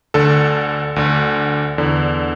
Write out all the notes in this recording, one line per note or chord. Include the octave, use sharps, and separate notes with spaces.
D2 D3 A4
D2 D3
E2 D3